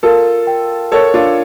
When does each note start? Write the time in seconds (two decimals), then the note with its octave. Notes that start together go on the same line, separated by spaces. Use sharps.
0.03 F4 A4 A#4
0.47 G5
0.92 A4 A#4 C#5
1.14 D4 F4